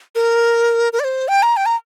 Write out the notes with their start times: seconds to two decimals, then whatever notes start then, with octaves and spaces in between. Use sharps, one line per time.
0.15 A#4
0.93 A#4
1.00 D5
1.04 C5
1.28 G5
1.43 A#5
1.57 G5
1.66 A#5